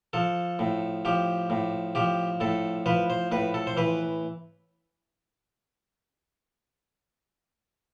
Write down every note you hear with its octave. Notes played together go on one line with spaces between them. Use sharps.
F3 A4
A2
F3 G4
A2
F3 G4
A2 A4
F3 B4
C5
A2 B4
A4
C5
E3 B4